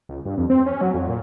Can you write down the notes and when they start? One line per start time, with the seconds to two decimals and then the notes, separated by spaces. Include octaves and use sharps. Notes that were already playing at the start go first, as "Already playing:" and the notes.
0.09 C#2
0.25 G2
0.37 F2
0.50 C4
0.66 C#4
0.81 F#3
0.94 F2
1.08 A#2